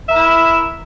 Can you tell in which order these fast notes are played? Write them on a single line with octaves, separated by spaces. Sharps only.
E5 A#4 E4